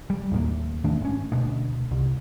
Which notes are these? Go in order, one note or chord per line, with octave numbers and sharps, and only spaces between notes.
G3
D#2 A2 A#3
D#3 A3 D4
G#1 C#4
D2 B2
C2